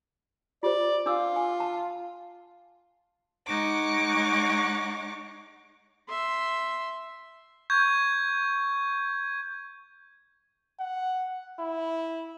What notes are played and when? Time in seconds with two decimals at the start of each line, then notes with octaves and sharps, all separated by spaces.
0.63 F4 G4 C5 D5
1.06 D4 F4 D6 E6
1.36 G#5
1.60 A5
3.46 G#3 D#4 C#5 F#5 D6
6.09 E5 C6
7.70 C#6 G6 G#6
10.79 F#5
11.59 E4